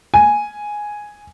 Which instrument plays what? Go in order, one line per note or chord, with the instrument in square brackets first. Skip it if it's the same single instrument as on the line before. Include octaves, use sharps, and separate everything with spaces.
[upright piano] G#5